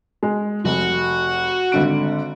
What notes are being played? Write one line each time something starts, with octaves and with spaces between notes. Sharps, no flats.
G#3
F1 F#4
G#1 D3 D7